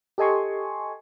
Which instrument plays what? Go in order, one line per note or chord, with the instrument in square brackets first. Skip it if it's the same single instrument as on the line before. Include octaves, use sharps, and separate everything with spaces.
[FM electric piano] G4 A4 D#5 G#5 C6 C#6